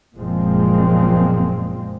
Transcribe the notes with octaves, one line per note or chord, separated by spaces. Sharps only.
F#1 A#2 F3 G#3 C4